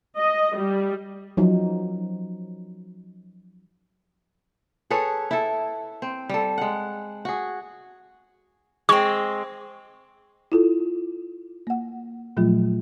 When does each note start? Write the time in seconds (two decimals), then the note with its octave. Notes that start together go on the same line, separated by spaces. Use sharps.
0.18 D#5
0.57 G3
1.37 F3 F#3 D#4
4.90 G#4 A4 B4 C#5
5.31 E4 A4
6.02 C4
6.29 G3 A4
6.58 G#3 F#5
7.25 F#4 G#4
8.89 G#3 C4 C#6
10.52 E4 F4 A4
11.67 A#3 F#5
12.37 A#2 F3 F#3 A3 F4